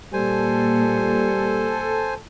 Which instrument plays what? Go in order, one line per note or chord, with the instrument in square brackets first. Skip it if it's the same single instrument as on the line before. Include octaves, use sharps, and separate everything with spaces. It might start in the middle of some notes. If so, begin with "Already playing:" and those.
[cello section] A#2 [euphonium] G3 [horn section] A4 [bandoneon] C5 G#5